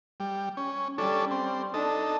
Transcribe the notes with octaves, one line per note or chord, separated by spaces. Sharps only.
G3
C#4
G3 C#4 D4 A4
C4
D4 D#4 A4